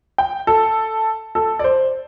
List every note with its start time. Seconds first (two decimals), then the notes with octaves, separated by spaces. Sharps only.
0.18 G5
0.47 A4
1.35 A4
1.59 D5
1.64 C5